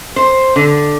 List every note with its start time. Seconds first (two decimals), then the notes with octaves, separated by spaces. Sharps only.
0.16 C5
0.56 D3